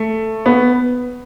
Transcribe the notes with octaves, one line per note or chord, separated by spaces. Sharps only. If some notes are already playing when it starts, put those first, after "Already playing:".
Already playing: A3
B3